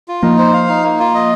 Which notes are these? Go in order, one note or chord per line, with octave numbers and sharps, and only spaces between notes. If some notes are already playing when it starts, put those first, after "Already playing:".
F4
F3 A#3 D#4
C5
F5
D#4
A#3
F4
D#5